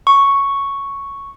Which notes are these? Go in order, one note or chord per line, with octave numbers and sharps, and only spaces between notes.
C#6